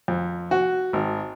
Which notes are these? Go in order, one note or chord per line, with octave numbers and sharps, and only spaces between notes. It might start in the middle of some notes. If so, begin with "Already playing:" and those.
F2
F#4
G#1